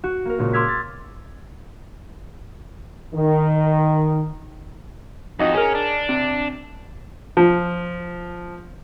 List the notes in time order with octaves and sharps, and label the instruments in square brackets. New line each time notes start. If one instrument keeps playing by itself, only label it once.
[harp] F#4
A#3 A#4
C#2 A#2
C6 D6 E6 F6 G#6 B6
A6
[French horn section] D#3
[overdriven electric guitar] F2 [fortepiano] D#4 F#4 D#5
[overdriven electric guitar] C#4 [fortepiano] G#4 A#4
[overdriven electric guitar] D4
[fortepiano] C3
F3